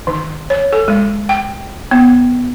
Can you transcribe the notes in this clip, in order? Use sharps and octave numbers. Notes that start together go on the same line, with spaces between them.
D#3
C#5
A4
G#3
G5
B3